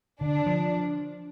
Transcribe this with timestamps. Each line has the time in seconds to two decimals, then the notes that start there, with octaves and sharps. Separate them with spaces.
0.21 D3 D4
0.46 F3